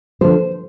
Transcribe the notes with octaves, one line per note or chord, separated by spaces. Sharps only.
D3 F3 A#3 C5